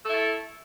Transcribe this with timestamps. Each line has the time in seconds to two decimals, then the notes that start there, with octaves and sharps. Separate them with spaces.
0.05 A4
0.09 E4
0.13 A3